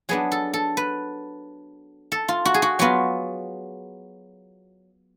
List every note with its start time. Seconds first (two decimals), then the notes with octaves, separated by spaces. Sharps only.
0.09 F#3 B3 D4 G#4
0.32 A4
0.54 A4
0.77 B4
2.12 A4
2.28 F4
2.45 F#4
2.54 G#4
2.62 F#4
2.79 F#3 B3 F4 F#4